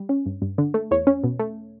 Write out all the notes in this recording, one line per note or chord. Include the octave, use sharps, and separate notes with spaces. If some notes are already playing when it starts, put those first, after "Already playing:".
Already playing: G3
C#4
G2
G2
D3
A3
E2 C#5
C#4
B2
A3